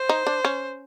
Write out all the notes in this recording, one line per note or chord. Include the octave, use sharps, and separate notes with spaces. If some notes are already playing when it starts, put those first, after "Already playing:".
Already playing: C5
D#4
D4
C#4